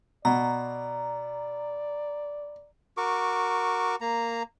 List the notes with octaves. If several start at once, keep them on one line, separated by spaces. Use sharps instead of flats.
B2 D5 A#5
F#4 A#4 C#6 D6
A#3 A#5